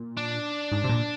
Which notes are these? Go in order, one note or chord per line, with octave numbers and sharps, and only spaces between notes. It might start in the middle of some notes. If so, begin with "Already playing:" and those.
Already playing: A#2
D4
G#2
C3
A#2